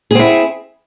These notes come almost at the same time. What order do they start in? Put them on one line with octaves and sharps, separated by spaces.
G#4 C4 E4